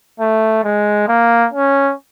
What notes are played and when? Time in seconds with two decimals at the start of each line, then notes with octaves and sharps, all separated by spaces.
0.20 A3
0.64 G#3
1.08 A#3
1.53 C#4